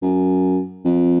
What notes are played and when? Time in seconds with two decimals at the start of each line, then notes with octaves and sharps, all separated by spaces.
0.02 F#2
0.85 F2